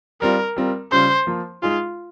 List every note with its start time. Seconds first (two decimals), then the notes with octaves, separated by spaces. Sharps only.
0.21 G3 C4 F4 A#4
0.56 G3 C4 F4 A#4
0.92 C#3 G3 C#4 F4 C5
1.27 F3 A#3 F4
1.62 G#3 D#4 F4 G#4